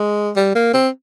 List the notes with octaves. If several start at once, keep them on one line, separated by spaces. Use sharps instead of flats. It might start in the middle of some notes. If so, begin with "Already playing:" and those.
Already playing: G#3
G3
A#3
C4